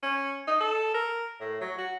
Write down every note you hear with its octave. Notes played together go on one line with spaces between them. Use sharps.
C#4
D#4
A4
A#4
A2
F#3
F#4